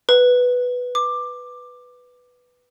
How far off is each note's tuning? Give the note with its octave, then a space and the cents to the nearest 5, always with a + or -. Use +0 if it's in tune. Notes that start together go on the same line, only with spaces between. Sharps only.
B4 +0
D6 +15